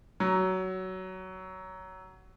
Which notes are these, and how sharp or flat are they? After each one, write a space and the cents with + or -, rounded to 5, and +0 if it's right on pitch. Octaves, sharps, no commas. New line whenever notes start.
F#3 +15